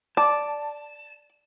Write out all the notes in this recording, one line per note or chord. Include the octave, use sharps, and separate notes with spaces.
D5 A5